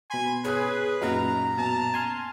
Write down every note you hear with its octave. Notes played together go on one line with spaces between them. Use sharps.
B2 G#5 B5 C6
G#4 B4 C#5 G#5 F#6
F#2 A#2 D#4 F5 F#5 A#5
B2 A5
G#5 C6 F6